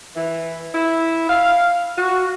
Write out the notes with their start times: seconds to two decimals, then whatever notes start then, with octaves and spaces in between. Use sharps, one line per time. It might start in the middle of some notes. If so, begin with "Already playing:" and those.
0.16 E3
0.74 E4
1.29 F5
1.98 F#4